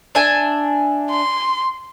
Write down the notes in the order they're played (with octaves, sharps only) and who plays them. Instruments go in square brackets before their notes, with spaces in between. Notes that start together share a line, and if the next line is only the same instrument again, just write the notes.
[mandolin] D4 E5 G#5
[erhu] C6